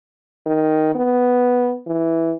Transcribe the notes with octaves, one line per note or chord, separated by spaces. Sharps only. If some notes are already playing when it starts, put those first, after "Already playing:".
D#3
B3
E3